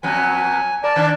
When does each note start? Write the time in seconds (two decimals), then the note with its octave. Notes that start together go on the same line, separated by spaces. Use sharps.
0.03 F2 F#3 B3 G#5
0.84 A#4 D5 A5
0.96 D#3 D4